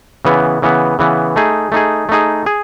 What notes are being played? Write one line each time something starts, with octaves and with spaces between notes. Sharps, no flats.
C#3 E3 B3
C#3 E3 B3
C#3 E3 B3
A3 D#4 G#4
A3 D#4 G#4
A3 D#4 G#4
G#4